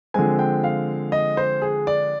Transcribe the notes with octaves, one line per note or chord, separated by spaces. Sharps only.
D3 F3 G#3 C4 G#5
G5
F5
D#5
C5
G#4
D5